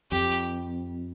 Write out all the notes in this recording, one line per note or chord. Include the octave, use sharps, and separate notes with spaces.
F2 G4